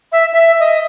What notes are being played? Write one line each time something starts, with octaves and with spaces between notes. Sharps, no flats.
E5
E5
D#5